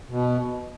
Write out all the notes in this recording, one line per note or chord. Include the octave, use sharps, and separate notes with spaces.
B2